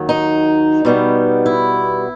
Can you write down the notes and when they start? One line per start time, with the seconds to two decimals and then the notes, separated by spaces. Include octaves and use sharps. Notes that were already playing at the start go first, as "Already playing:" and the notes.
Already playing: D#2 D#3 F#3
0.09 D#4
0.85 B2 G3 B3
1.46 E4